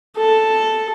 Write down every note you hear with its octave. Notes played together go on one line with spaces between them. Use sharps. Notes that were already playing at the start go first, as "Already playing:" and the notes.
A4